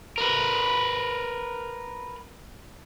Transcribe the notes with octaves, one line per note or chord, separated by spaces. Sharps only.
A#4 B4